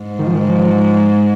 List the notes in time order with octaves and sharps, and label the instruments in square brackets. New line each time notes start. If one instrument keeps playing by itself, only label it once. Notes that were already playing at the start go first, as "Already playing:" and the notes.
Already playing: [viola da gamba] G#2
[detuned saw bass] D#3
F3
D#3
F3